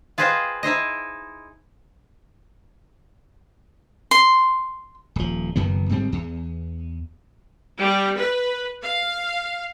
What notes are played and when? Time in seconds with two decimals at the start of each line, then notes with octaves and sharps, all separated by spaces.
0.18 F4 G#4 B4 C5 D#5 G5
0.63 D#4 E4 C5 D#5
4.11 C6
5.16 D#1 F3
5.56 F#1 F#2 D#3 B3
5.89 G1 G#2 G3 C4
6.12 E2
7.79 G3
8.18 B4
8.82 F5